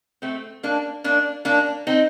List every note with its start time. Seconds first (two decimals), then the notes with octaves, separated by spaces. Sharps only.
0.22 A3 C4
0.63 A#3 D4
1.04 A#3 D4
1.45 A#3 D4
1.87 C4 D#4